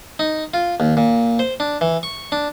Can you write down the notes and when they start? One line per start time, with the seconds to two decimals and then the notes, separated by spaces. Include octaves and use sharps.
0.19 D#4
0.54 F4
0.80 D#2
0.97 A#2
1.39 C5
1.60 D4
1.81 E3
2.03 C#6
2.32 D4